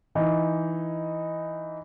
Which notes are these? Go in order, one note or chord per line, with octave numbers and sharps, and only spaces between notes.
E3 D#4